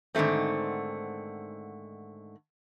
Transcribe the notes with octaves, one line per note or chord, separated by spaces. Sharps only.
G#2 D3 D#3 A3 C4